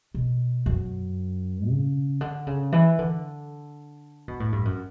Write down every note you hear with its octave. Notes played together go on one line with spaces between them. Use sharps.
B2
F#2
C#3
D3
C#3
E3
D3
B2
A2
G2
F#2